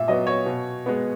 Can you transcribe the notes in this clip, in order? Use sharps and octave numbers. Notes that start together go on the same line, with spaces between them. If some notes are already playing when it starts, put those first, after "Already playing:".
Already playing: A#2 E5
F#3 B3 D#5
C#5
B2
G#3 B3